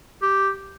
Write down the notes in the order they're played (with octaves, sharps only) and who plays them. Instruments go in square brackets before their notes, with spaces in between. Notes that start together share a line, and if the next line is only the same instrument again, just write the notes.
[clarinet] G4